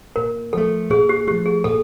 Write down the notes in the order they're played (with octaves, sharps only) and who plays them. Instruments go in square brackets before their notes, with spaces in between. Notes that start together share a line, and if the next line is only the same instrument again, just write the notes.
[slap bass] A#2 [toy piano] A#4
[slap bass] F3 A3 [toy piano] A4
[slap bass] A#2 [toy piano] G#4
[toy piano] G4
[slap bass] A3 [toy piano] G4
[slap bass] F3
[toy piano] G#4
[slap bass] A#2 [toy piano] A4